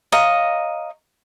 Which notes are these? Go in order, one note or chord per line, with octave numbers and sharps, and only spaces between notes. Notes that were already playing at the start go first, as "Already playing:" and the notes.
C#5 D#5 F5 A#5